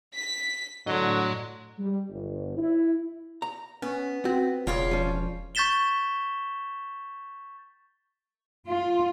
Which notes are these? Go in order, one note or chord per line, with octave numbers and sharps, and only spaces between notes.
B6
A2 D3 F#3 D#5 C6
G3
G1
E4
A#5
B3 C#4
C4 F#4
E1 C#3 F4 C#5 D5
F3 C#4
C#6 G6 A6 B6 E7 G7
F4